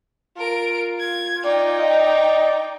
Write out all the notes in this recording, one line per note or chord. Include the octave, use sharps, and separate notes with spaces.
F4 A#4 D7
G#6
D#4 D5 G5
D#5